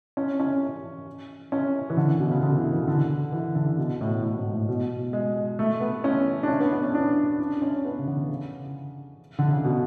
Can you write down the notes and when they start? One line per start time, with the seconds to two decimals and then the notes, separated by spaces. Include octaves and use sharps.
0.17 C#4
0.40 C#4
1.52 C#4
1.90 E3
1.97 D3
2.19 B2
2.31 C#3
2.42 D3
2.57 E3
2.72 E3
2.87 D3
3.32 E3
3.55 D3
3.77 B2
4.01 A2
4.23 A2
4.38 G#2
4.53 A2
4.69 B2
5.13 G#3
5.59 A3
5.80 B3
6.04 C#4
6.43 D4
6.48 C#4
6.60 B3
6.71 B3
6.83 C#4
6.95 D4
7.40 D4
7.62 C#4
7.85 B3
7.98 C#3
8.07 D3
8.29 C#3
9.39 D3
9.52 C#3
9.65 B2